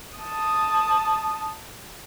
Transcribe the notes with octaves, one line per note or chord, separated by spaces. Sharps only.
A5 D#6